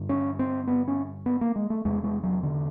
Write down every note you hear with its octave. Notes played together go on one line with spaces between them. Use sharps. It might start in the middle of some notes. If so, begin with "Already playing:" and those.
Already playing: G2 D3
C#4
C4
B3
C#4
B3
A#3
G#3
A3
E2 C3 G#3
G#3
F#3
D3